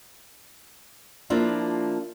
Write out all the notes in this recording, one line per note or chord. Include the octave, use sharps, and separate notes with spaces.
F3 A#3 D4 E4 F4